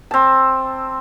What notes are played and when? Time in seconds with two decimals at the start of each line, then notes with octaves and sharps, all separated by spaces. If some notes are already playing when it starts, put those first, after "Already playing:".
0.11 C4 A5